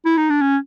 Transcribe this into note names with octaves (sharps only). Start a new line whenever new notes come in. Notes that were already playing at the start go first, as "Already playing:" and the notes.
E4
D#4
D4
C#4